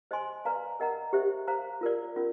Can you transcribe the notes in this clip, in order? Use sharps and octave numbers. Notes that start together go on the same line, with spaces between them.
C5 D#5 G#5 C6
B4 D5 F5 A#5
A#4 D#5 F#5 A#5
G4 C5 E5
C5 F5 A#5
F4 A#4 D5
C#4 F4 A#4